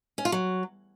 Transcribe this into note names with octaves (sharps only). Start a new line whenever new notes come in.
C#4
F4
F#3